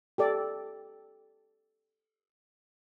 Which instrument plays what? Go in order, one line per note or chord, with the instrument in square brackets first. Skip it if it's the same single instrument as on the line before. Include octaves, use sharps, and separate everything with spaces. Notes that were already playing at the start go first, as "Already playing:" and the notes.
[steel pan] G4 A4 D5